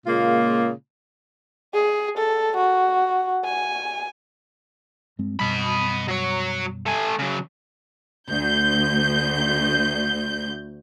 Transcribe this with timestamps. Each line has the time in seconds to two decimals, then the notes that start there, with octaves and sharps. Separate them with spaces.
0.07 A#2 C#3 G#3 A#3 F4
1.74 G#4
2.17 A4
2.56 F#4
3.44 G#5
5.19 G2 G#3 C4
5.40 F#2 B2 G3 D#5 B5
6.08 F#3 C#5
6.86 A3 G#5
7.19 C#3 F#3
8.28 D2 G6